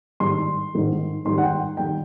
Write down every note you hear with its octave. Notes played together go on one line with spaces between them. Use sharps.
G#2 D#3 G3 C6
G#2 D#3 G3
G#2 D#3 G3 C6
F#5
G5
D#3 G3 G5